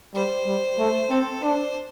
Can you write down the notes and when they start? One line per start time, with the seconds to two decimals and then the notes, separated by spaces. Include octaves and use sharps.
0.14 G3 C5
0.47 G3
0.79 A3
1.11 C4 A4
1.42 D4 C5